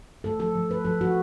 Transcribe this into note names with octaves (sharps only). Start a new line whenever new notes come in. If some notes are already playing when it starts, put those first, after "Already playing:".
A3 A4
F3 A4
F3
A3 B4
F3 A4
F3 F#4